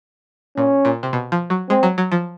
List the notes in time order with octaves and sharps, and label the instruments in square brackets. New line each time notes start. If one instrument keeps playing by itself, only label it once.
[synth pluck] A#2 [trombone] C#4
[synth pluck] A#2
C3
B2
F3
F#3
[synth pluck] G#3 [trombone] C4
[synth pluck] F#3
F#3
F3